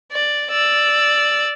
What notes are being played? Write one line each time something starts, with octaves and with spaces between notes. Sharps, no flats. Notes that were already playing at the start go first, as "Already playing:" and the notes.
D5
D5 E6